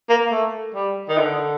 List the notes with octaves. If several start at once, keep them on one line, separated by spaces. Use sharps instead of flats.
A#3
A3
G3
D#3
D3